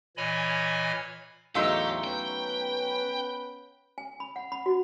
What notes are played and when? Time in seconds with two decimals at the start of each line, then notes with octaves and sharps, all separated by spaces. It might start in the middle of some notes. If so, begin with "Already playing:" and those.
0.17 A#2 E3 C#5 D#5 G#5 B5
1.55 E2 A2 F#3 A3 D#4 G4 F5 C6
2.04 B3 C#4 B4 G5
3.98 G#5
4.20 B5
4.36 F#5
4.52 B5
4.66 F#4